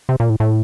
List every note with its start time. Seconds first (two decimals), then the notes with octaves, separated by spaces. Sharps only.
0.09 C3
0.20 A#2
0.30 A2
0.40 A2